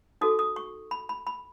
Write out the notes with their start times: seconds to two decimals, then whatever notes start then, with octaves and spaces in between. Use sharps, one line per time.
0.21 D#4 F#4 A4 D#6
0.39 D#6
0.56 C#6
0.91 B5
1.09 B5
1.27 B5